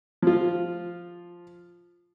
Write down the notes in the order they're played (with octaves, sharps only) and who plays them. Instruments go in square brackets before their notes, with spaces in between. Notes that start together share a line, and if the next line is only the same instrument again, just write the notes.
[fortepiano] F3 F4